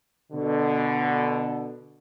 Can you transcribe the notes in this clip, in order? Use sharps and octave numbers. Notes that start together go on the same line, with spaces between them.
B2 D3